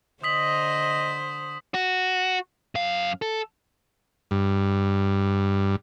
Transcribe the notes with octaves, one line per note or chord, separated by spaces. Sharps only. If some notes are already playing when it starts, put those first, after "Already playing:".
D3 C5 D#5 D#6 B6 F#7
F#4
F#2 F5
A4
G2